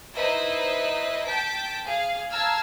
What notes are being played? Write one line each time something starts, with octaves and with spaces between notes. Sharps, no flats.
D#4 E4 B4 C5 D#5 E5
G5 A5 G6 B6 D7
G#4 F5
F5 A5 A#5 E6 F6 G#6